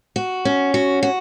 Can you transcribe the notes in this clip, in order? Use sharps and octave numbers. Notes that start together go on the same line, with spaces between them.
F#4
C#4
F#4
F#4